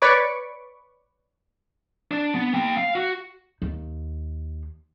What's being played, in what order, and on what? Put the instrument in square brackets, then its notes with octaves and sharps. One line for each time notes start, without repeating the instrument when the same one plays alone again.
[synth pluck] B4 C#5 D5 B5 C#6 D6
[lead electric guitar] D4
B3
A#3 G5
F5
F#4
[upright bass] D#2